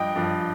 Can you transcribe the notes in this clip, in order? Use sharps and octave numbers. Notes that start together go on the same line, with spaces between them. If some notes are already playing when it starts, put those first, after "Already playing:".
Already playing: G2 F3 D#5 G5
G2 F3